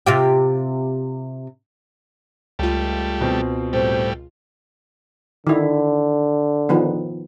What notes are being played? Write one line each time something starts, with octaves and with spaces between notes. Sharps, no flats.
C3 F4 G4
C#2 G3 A3 F4
B2 C4
A2 G3 C5
D3 D#3 E4
D#3 F3 B3